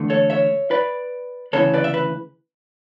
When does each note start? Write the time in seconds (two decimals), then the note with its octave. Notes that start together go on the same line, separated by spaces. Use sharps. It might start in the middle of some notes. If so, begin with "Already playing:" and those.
Already playing: E2 D3 A3
0.10 A4 C#5
0.30 C#5 E5
0.71 B4 D5
1.53 D2 C#3 E3 A4 C#5
1.74 B4 D5
1.84 E5
1.94 B4